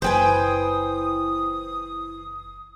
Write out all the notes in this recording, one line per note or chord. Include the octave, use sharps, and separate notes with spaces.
F#1 E3 B4 C5 G5 G#5 D#6